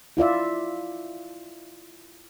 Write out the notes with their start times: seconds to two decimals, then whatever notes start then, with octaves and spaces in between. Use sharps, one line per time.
0.17 E4 F4 D5 E5